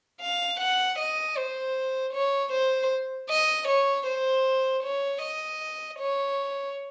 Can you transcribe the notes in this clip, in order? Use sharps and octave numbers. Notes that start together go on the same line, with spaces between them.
F5
F#5
D#5
C5
C#5
C5
D#5
C#5
C5
C#5
D#5
C#5